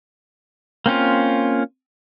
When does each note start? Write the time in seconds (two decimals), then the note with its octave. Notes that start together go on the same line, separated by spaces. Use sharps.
0.86 A#3 C4 C#4 F4